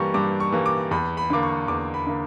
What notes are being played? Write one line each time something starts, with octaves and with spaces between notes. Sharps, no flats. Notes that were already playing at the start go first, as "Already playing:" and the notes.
Already playing: G2 E3 G3 A#3 C#6
G2 D6
C#6
E3 G3 A#3
D6
E2 B5
B5
D3 A#3 D6
C#6
E2 D6
B5
D3 A#3